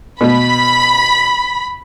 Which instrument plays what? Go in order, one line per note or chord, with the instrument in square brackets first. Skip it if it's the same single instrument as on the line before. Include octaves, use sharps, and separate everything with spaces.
[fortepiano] B2 [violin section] B5